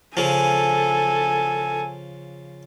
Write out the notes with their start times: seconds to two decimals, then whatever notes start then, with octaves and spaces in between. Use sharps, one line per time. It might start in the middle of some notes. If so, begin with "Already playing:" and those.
0.17 C#3 F3 A4 G#5